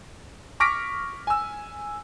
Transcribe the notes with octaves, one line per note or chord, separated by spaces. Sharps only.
C#6 D6 F6 A#6 B6 D7
G#5 E6